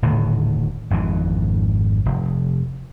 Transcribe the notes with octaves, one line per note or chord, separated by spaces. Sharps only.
D#1 A2 D3 D#3
G#1 F2 G#2 E3
F1